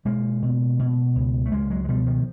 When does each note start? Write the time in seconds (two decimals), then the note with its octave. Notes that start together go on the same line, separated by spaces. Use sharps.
0.05 B2 G#3 A#3
0.42 B2
0.79 B2
1.15 C#2
1.46 A3
1.52 C#2 G#3 A#3
1.70 F#3 G#3
1.84 G#3
1.88 B2 F3 G3
2.07 D#3 F3